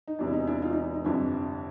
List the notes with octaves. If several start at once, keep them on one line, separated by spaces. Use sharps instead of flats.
D#4
E1 E2 C3 D4
E4
D#4
D4 E4
D#4 F4
D#4
D#4
G1 F2 C3 D4 E4